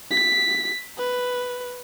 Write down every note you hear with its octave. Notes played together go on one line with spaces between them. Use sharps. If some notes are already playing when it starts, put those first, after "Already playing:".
B6
B4